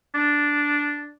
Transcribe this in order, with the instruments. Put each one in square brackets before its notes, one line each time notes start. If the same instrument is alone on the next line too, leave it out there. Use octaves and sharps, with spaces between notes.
[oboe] D4